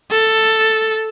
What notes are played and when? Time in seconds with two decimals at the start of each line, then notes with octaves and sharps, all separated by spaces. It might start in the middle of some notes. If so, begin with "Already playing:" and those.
0.11 A4